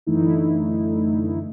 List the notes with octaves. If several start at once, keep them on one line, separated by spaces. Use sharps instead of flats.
F#2 D3 E3 A3 D#4 E4